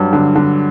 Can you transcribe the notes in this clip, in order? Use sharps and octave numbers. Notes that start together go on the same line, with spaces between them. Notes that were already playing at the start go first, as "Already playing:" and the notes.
Already playing: G2 F#3
D3
D3